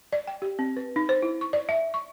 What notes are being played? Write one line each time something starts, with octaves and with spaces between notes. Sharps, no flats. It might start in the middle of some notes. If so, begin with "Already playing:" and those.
D5
G5
G4
C4
B4
D#4
C5
E4
C#6
D5
E5
C#6